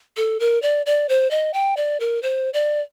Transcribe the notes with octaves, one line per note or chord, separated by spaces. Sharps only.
A4
A#4
D5
D5
C5
D#5
G5
D5
A#4
C5
D5